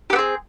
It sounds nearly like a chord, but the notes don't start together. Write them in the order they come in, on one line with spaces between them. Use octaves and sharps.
G4 B3 C4 G#4